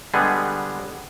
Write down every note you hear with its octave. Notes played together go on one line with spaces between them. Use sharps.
D3 G3 G#3 B3 G#4